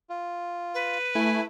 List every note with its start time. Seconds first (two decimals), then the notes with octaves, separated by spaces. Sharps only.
0.10 F4
0.74 B4
1.15 A3 E4 G#5